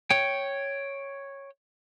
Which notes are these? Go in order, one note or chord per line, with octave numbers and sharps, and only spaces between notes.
C#5 G5